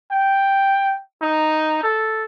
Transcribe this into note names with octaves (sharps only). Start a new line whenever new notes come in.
G5
D#4
A4